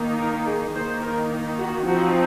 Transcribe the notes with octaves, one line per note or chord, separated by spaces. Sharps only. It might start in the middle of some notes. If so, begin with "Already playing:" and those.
Already playing: D#3 A#3 D#4
A#4
G#4
D#3 A#3 D#4 C5
A#4
F#4
F3 C4 D#4 F#4